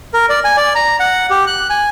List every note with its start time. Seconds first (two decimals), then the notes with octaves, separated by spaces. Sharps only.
0.14 A#4
0.29 D5
0.45 G#5
0.57 D5
0.75 A#5
1.00 F#5
1.31 G4
1.47 F#6
1.70 G#5